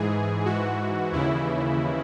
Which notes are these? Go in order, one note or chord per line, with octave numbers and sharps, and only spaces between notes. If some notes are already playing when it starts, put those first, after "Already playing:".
Already playing: G#2 E3 G#4
G#2 E3 F#4
D#2 C#3 E3 E4